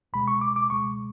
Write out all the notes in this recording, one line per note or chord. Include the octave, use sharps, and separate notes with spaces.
C#2 B2 G#3 B5
C#6
D6
D6
C#2 B2 G#3 C#6